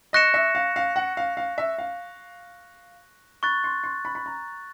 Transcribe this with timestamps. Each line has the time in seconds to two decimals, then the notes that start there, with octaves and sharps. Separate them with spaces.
0.13 D#5 C#6 F#6 A#6 C#7 E7
0.34 E5
0.55 F5
0.76 F5
0.96 F#5
1.17 F5
1.37 F5
1.58 E5
1.78 F5
3.43 B5 C#6 F#6 A6
3.64 C6
3.84 C6
4.05 B5
4.15 B5
4.26 A#5